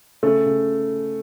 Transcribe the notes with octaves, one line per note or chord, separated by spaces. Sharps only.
C#3 A3
C#3